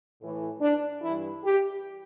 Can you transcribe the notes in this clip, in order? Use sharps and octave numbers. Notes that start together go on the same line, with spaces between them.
A2 E3
D4
G2 E3 E4
G4